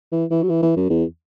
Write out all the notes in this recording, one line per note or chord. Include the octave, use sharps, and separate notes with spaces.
E3
E3
F#3
E3
E3
F#2
E2